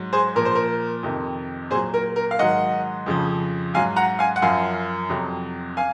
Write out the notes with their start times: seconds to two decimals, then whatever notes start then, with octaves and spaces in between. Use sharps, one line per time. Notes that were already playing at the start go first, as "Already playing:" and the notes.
Already playing: G#2 F#3
0.13 G#4 C5
0.36 A#2 F3 A#4
0.45 C5
0.55 A#4
1.03 F2 C3 D#3
1.71 A#2 F#3 G#4 C5
1.94 A#4
2.16 A#4
2.31 F5
2.39 G#2 D#3 F#3 D#5 F#5
3.06 F2 C#3 F3
3.74 G#2 F#3 F5 G#5
3.96 F#5 A#5
4.19 F5 G#5
4.36 F#5
4.42 F#2 F3 F5 G#5
5.10 F2 C3 F#3
5.77 F5 G#5